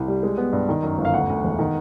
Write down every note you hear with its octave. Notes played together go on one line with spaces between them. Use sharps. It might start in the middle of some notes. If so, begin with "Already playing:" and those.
Already playing: C2
G3
G#3
B3
G2
D#3
F#2
G1
F5
D2 F#5
D2
E1
D#3